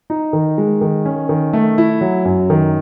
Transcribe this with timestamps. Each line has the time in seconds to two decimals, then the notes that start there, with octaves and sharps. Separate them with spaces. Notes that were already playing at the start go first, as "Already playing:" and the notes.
0.10 D#4
0.33 D#3
0.58 G#3
0.81 D#3
1.05 C#4
1.29 D#3
1.53 A3
1.78 E4
2.01 F#3
2.25 F#2
2.50 D#3